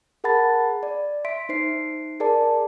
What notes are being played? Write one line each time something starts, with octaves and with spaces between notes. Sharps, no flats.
G#4 A#4 F#5 A5 B5 A6
D5
E5 C6 B6 D7
D#4 C5 C7
G#4 A#4 D5 A5